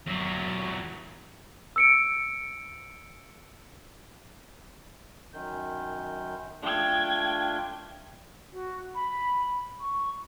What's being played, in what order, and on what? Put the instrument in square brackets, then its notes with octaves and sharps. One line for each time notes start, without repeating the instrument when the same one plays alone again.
[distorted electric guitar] E2 F#3
[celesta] E6 C#7 D7
[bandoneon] F#2 D#3 G6
[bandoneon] A3 D4 F4 [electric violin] G5 G#6
[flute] F#4
B5
C#6